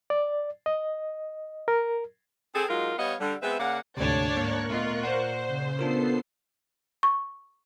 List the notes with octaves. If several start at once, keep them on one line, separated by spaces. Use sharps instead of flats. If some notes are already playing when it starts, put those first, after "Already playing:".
D5
D#5
A#4
C4 G#4 A4
F#3 G#3 D#4 F4 A#4
G3 B3 C#5 D#5 F5 F#5
D3 G3
G#3 B3 C4 B4 E5
C#3 A#3 D5 F5 F#5
D2 G#2 C3 A3 D4 C#5 D5
G#2 A#3 A#4 C#6 F#6
A#2 A3 B3 F4 D#5
C5 D5 F#5
C#3
B3 D4 F4 A4 A#4 C7
C#6